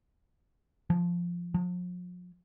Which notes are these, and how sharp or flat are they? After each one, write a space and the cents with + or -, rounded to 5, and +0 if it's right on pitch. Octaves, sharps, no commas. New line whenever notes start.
F3 -5
F3 +40